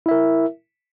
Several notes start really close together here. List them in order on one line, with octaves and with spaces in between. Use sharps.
E4 E5 A#4